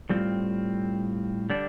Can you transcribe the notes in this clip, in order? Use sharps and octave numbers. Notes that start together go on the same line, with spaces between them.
A2 G3 C4 F4
D3 G3 D4